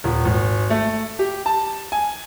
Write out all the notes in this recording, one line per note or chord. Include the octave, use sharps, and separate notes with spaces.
D#1
G#1
A3
G4
A5
G#5